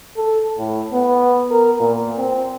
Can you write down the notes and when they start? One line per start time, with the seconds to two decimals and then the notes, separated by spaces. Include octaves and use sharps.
0.17 A4
0.58 A2
0.93 B3
1.50 A#4
1.80 A#2
2.18 C4